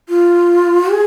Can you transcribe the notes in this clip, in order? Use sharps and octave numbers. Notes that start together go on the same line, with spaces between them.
F4
G#4